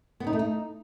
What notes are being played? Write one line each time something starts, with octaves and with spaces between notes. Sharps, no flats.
B3
D#4
A3
D#4